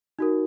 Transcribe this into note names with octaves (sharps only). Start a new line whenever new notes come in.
D#4 F#4 A#4